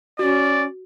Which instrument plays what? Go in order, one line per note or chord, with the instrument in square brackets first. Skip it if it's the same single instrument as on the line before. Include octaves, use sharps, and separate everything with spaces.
[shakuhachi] C#4 [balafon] F#4 [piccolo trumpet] D5